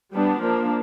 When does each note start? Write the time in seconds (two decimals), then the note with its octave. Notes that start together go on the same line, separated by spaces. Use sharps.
0.12 G3 B3 D4
0.40 F3 A#3 D4